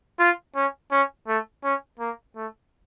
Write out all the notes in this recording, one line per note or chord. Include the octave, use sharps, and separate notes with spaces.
F4
C#4
C#4
A3
C#4
A#3
A3